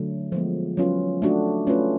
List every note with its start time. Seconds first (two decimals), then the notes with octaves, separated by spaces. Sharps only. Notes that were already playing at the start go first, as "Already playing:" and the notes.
Already playing: D3 F#3 A3
0.32 F3 G#3 B3
0.77 F#3 C#4 F4 B4
1.22 A3 D4 F#4
1.67 A3 C#4 F4 B4